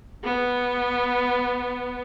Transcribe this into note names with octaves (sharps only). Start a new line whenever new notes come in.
B3